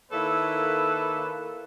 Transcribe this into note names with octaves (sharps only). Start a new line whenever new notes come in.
D#3 A#3 E4 A4 B4 C#5